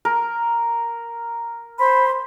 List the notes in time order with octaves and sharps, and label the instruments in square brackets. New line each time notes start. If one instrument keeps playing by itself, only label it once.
[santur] A#4
[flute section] C5 B5 C6